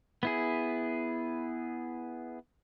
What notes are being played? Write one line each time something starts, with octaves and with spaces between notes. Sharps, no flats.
B3 E4 G#4